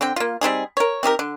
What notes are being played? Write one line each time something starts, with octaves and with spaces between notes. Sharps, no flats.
D3 C4 G5
A#3 F4
G3 C4 D#4 G#4
A#4 C#5
C4 D#4 G4 A#4
D3